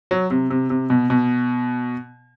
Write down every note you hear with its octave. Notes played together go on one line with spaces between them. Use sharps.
F#3
C3
C3
C3
B2
B2